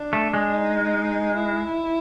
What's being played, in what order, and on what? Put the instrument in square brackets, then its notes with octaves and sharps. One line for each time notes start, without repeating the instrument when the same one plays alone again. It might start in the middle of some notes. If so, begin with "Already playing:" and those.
Already playing: [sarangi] D4
[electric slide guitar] A3
G#3
[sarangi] D#4
E4